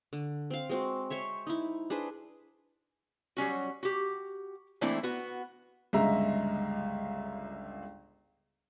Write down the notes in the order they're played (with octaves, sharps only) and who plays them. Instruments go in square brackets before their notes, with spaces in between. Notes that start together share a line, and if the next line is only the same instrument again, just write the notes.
[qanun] D3
C4 F5
G#3 C4 F#4
C5 C#5 E5
D#4 E4
D4 G#4 B4 C5
[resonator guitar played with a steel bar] F#3 G3 C#4 F#4
F#4 G4
E3 A3 A#3 C4 D4 E4
B3 F#4 B4
[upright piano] G1 C#2 G#3 E5 A#5